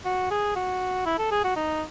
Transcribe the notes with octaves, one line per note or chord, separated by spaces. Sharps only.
F#4
G#4
F#4
E4
A4
G#4
F#4
D#4